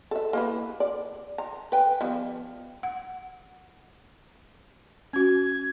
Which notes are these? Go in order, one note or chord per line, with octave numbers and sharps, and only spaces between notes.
A4 E5
A#3 E4 B4
D5
A#5
B4 G5 G#5
F3 G3 B3
F#5
C#4 F#4 G#6